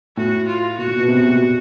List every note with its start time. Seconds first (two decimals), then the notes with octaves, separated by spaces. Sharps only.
0.17 A2 F#4
0.47 F4
0.78 A#2 F#4
0.88 A#2
0.99 B2
1.08 C3
1.19 B2
1.28 A#2